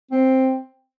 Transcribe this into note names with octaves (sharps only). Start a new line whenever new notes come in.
C4